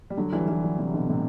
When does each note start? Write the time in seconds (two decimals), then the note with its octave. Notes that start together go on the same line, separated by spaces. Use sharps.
0.10 G3
0.17 D3 F#3
0.33 E3 G3
0.48 E3 G3
0.63 D3 F#3
0.78 C3 E3
0.94 B2 D3
1.10 A2 C3